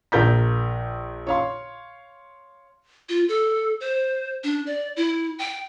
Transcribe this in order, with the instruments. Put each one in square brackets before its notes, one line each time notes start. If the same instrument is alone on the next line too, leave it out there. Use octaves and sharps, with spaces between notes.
[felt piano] A#1 A#4 G6 B6
C#5 F5 C6
[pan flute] F4
A4
C5
D4
D5
E4
G5